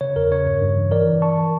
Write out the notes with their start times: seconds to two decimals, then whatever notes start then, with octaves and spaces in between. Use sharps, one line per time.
0.01 C#3 C#5
0.16 E2 A#4
0.31 C#3 C#5
0.46 G2 C#5
0.62 G2
0.77 E3
0.92 E3 A#4 D5
1.07 E3
1.21 E3 A5 C#6
1.37 E3